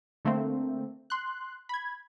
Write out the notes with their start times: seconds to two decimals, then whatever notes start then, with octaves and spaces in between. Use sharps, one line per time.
0.25 D3 A3 A#3 C4
1.10 C6 F#6
1.69 B5 G#6